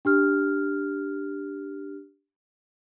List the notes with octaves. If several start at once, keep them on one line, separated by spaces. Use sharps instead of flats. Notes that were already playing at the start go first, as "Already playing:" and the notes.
D4 G4 F6